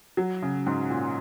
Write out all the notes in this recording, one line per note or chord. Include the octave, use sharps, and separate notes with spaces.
F#3
C#3
G#2
A#2